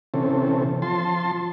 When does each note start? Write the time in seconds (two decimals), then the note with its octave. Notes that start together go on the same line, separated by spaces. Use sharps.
0.14 C3 E3 C4 C#4 A4
0.82 F3 A5 C6